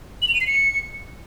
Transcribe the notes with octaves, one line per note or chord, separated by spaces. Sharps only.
F#7
F7
D#7
C7
C#7